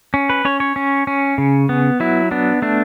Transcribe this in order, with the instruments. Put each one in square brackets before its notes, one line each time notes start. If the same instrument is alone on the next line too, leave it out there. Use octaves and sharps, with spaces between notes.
[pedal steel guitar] C#4
B4
C#4 C#5
C#5
C#4
C#4
C#3
B3
F#3 E4
B3 D4
A3 D4